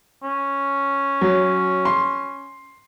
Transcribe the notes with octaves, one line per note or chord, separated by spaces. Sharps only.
C#4
F#3
C6